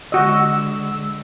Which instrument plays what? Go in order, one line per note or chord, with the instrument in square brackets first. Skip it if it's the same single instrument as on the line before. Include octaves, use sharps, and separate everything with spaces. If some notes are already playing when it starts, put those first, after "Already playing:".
[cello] D3 G#3 [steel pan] F#4 D#5 [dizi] E6